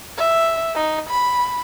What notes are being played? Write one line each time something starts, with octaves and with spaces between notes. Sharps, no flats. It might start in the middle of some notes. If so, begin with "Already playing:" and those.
E5
D#4
B5